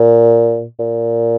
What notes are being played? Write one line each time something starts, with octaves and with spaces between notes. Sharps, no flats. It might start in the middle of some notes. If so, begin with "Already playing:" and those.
Already playing: A#2
A#2